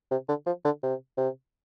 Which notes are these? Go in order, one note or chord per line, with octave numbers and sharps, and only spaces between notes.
C3
D3
F3
D3
C3
C3